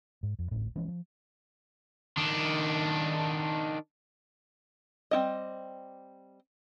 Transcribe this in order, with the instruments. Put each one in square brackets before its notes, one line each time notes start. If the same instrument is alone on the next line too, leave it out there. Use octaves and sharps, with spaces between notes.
[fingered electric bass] G#2
F2
D1 G#1 A2
E3 F3 G#3 C#4
F3
[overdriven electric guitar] D#3 D4
[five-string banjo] G3 C4 E4 D#5